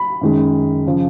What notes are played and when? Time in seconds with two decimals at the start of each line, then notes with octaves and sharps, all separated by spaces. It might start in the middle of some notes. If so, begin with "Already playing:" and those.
Already playing: B5
0.21 F#2 D#3 G#3
0.87 C#3 F3